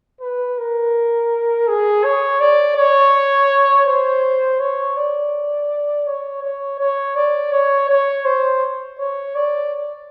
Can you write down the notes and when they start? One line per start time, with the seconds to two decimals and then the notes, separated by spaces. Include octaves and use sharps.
0.21 B4
0.58 A#4
1.68 G#4
2.04 C#5
2.41 D5
2.77 C#5
3.87 C5
4.60 C#5
4.97 D5
6.07 C#5
6.43 C#5
6.79 C#5
7.16 D5
7.52 C#5
7.90 C#5
8.25 C5
8.99 C#5
9.35 D5